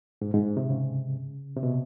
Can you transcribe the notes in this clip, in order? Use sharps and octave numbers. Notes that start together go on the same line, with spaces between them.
G#2
G#2
C3
C#3
C3
B2